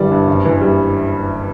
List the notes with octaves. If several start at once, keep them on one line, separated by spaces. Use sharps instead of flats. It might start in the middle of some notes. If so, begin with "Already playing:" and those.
Already playing: G1 E3 G3 D5
G2
F#1
E3
G3